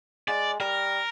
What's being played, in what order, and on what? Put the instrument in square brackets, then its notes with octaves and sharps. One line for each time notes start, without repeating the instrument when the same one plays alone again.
[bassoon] G#3 [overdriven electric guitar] D5
[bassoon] G3 [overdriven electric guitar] A#4